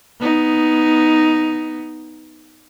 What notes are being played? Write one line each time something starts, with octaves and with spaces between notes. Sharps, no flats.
B3 D#4